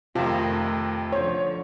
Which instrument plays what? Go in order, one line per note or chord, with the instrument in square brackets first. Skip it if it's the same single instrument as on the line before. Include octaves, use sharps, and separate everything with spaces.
[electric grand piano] F2 C3 [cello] D#3 A3 [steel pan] F4 A5
[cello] D3 F3 [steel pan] C5 [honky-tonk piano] C#5